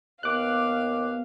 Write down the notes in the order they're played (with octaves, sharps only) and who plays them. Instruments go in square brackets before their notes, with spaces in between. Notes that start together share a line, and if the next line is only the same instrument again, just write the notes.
[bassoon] D#2 [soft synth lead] B3 [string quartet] F5 [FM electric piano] D6 F#6